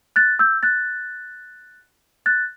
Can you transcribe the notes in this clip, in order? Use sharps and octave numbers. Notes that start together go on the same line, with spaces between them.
F#6 A6
E6 G6
F#6 A6
F#6 A6